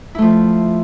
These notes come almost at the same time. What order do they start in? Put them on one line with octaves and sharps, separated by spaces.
E4 A3 F3